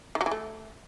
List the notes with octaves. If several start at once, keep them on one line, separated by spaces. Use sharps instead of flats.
D#3
F#3
E3
A3